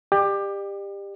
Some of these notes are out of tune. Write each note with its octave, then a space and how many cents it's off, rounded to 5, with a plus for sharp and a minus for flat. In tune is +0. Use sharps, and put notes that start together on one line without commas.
G4 +20 D5 +40